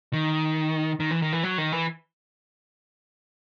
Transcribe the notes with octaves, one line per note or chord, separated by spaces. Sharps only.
D#3
D#3
E3
D#3
E3
F#3
D#3
E3